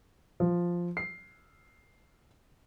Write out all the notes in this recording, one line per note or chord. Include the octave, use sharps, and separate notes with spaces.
F3
C7